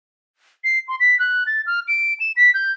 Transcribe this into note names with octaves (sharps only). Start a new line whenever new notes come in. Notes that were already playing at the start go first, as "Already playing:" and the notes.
C7
C6
B6
F#6
A6
F6
D7
E7
B6
G6